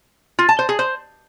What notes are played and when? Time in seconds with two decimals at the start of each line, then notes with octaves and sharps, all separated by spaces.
0.39 F4
0.49 A5
0.59 C5
0.69 G#4
0.79 C5